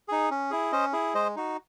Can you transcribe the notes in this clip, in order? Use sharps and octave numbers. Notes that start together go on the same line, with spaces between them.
D#4 G#4
C#4
E4 G#4
C#4 C5 D#5
E4 G#4
G#3 C5 D#5
D#4 F#4